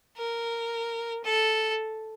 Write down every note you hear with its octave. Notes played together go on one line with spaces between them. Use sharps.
A#4
A4